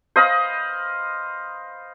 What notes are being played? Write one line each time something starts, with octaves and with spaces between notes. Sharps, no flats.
C5 D#5 F5 B5